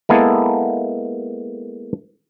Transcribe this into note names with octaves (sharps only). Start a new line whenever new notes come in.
G#3 A#3 B3 E4 A4